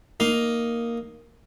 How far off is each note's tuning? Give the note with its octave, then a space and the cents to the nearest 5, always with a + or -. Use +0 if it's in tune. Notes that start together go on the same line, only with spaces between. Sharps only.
A#3 +0 D#4 +0